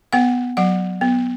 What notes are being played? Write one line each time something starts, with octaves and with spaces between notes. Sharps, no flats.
B3 F#5
F#3 F#5
B3